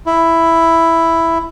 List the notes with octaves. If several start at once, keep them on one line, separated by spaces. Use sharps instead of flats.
E4